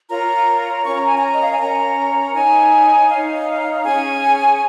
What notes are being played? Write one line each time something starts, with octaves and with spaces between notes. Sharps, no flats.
F4 A#4 C#5 A#5
C#4 A#4 C#5 C#6
A#5
G#5
A#5
D#5
F5
G#5
C#4 A#4 C#5 A#5
D#4 C#5 G#5
D#4 C#5 F5
C#4 G#4 C#5 G#5